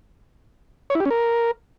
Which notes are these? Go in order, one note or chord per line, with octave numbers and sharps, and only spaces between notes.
C#5
E4
G4
C#4
A#4